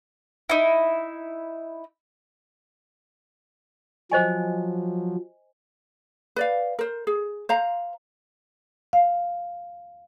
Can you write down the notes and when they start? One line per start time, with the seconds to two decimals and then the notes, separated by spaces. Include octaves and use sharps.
0.49 D#4 E4
4.12 F3 F#3 C5 D#5 G#5
6.36 B4 D5 F5
6.79 A#4 C5
7.07 G#4
7.49 C5 F5 A#5
8.93 F5